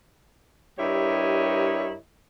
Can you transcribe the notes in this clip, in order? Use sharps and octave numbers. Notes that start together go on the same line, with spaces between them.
G2 E4 G4 A#4 C#5 D#5